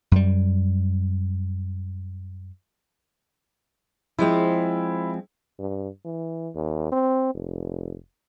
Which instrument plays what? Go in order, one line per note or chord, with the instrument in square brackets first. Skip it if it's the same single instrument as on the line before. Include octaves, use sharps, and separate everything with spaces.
[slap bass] F#2 G3
[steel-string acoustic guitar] F3 G#3 C4 [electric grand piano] E4
[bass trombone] G2
E3
D#2
C4
F1